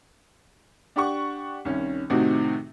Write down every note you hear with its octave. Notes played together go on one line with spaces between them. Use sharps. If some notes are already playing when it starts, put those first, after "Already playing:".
D4 G4 F#5 C#6
C2 D#3 C#4
A2 C3 D#3 C4 D#4 F#4